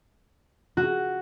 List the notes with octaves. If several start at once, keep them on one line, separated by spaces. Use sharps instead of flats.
F#4